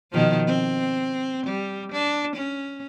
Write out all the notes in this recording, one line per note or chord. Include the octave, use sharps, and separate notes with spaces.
B2 D#3 F3
C4
G3
D4
C#4